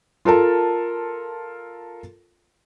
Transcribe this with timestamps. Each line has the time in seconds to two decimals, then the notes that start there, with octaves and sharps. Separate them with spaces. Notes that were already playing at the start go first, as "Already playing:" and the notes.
0.25 F4 A4 A#4 A5